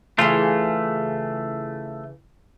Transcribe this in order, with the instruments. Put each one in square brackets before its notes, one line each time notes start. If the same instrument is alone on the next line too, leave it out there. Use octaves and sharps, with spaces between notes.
[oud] C#3 E3 G#4 [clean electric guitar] A3 F4